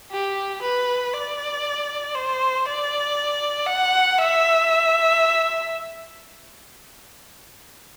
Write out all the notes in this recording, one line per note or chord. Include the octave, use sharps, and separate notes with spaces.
G4
B4
D5
C5
D5
F#5
E5